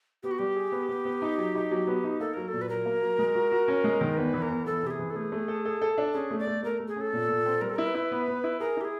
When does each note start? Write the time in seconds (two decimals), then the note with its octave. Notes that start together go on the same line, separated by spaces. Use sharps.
0.23 B3 G4
0.31 F#4
0.39 G3 G4
0.56 G#4
0.72 B3
0.89 B3
1.05 B3
1.22 D#4
1.38 F#3
1.55 D#4
1.71 F#3
1.87 B3
2.04 D#4
2.20 A#3 A4
2.33 F#3 A#4
2.48 A#2 A4
2.62 B4
2.69 F#3 A#4
2.85 A#3
3.02 F#3
3.19 G#3
3.35 F#4
3.52 F#4
3.68 C#4
3.84 G#3
4.01 D#3
4.17 E2 B4
4.34 E3
4.42 A#4
4.50 E2
4.66 E3 A4
4.83 C3 G4
4.90 G#4
4.99 E3
5.10 A4
5.15 A3 G#4
5.32 A3
5.48 A4
5.65 A4
5.82 A4
5.98 D4
6.14 C#4 G#4
6.31 A3
6.39 D5
6.47 A3
6.63 A3 A#4
6.80 A3
6.88 G#4
6.96 C#4 A4
7.13 A#2
7.29 A#2
7.46 C4
7.61 G3 A#4
7.70 A4
7.76 E4 A#4
7.87 B4
7.95 E4
8.11 B3
8.28 B3
8.44 E4
8.60 G#4 A#4
8.77 E4 G4
8.85 G#4